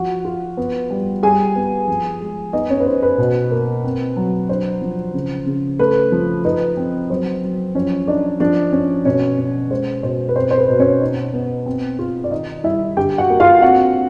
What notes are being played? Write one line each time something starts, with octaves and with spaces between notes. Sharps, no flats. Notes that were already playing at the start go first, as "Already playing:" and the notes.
Already playing: F3 F#4 F#5
F4
B3
G3
G3 G#4 G#5
B3
F3
G#3
B3 D#4 D#5
C#4 C#5
B4
D#4 C5
B4
B2
A#3
C4
F#3
D4 C5
F3
C#3
C#3
A3 B4
F3
D#4 B4
C4
F#3 C5
F#3
F3 C#4 C#5
D4 D#4 D5
F3 D4 D5
C#4
B2 C#4 C#5
C#4
G#3 C5
B2 C5
B4
C4 C5
C5
B4
B2
C#4 C#5
D#4
B3
C4
F4
D5
D#3 D#4 D#5
G3 E4 E5
D3 G4 G5
F#4 F#5
A#3
F4 F5
C4 F#4 F#5